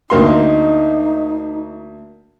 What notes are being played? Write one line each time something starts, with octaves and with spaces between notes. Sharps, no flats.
D2 A#3 D#4 C6